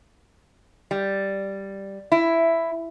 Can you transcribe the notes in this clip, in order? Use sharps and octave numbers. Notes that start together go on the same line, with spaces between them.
G3
E4